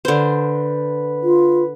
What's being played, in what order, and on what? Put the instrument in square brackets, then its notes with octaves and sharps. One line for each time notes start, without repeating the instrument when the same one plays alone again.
[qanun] D3 C5 [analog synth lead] B4
[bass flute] F4